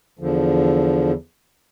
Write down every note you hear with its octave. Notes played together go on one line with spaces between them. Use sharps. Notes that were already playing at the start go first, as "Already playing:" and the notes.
E2 D3 F3